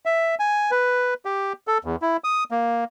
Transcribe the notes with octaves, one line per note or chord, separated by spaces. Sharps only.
E5
G#5
B4
G4
A4
E2
E4
D#6
A#3